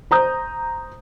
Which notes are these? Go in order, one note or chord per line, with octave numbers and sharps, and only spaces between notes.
C5 A#5 D#6 G6